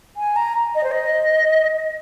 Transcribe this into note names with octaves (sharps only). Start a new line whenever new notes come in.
G#5
A#5
D#5
C5
D#5